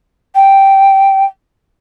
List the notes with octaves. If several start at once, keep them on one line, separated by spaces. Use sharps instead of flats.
G5